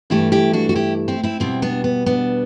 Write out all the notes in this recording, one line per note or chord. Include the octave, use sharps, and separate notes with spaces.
G2 E3 A3 E4 G4
E4 G4
D4 F#4
F#4
E4 G4
C4 E4
C4 E4
E2 B2 G3 C4 E4
B3 D4
B3
B3 D4